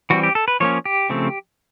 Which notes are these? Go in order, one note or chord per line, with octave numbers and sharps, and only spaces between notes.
E3 G3 C4 F#4
G4
A4
B4
F3 A#3 C#4 C#5
G4
C#3 F3 A3 C4